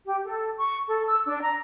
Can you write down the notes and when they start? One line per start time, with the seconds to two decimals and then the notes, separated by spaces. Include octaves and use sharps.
0.05 G4
0.24 A4
0.57 C#6
0.87 A4
1.06 E6
1.26 D4
1.41 A#5